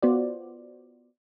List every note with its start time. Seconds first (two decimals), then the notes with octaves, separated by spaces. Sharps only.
0.02 B3 F4 F#4 C5 D5